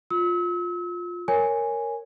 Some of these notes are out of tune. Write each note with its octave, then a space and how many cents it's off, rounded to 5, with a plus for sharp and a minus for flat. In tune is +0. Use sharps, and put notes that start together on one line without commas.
F4 +15 E6 -40
A#4 -5 C#5 +0 G#5 -5